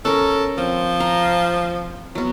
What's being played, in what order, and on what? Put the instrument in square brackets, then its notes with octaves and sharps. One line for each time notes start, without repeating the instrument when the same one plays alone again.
[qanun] C#4 A#4 [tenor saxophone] A4
[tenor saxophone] F3 [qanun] C4
[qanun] F5 A#5
F#3 B3